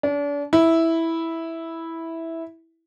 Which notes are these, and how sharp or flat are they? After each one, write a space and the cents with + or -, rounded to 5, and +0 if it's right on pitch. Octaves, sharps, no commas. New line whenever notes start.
D4 -35
E4 -5